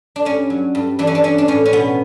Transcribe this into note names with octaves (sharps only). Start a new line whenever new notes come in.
D4
G2 C#4
F#3
G2
E3 D4
C#4
D4
E3 C#4
D4
A2 C#4
C#4
B2 B3